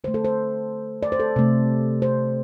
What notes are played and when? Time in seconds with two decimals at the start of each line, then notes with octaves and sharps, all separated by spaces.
0.04 D3 A3 C5
0.14 A4
0.25 C5
1.03 D5
1.12 C5
1.20 A4
1.36 C3 A3
2.02 C5